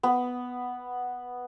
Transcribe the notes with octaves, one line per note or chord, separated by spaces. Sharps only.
B3